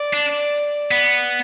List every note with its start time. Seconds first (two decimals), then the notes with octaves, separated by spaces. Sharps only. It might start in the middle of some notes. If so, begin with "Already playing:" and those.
Already playing: D5
0.14 D4
0.91 B3